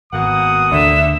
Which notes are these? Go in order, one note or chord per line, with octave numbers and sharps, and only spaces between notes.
G#1 B2 A#3 F#5 D#6
D2 D3 E5